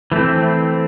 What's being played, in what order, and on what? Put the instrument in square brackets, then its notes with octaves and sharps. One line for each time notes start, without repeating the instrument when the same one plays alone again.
[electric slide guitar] E3 A3 C4